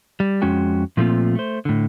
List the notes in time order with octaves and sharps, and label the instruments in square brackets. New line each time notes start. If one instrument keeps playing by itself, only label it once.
[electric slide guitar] G3
F2 G#3 C#4 F#4 G5
A#2 F3 A3 A#3 C4 F4
A3 C5
A2 D3